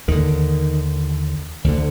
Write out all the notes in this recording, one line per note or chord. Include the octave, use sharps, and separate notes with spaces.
D#2 D3 D#3
D2 D3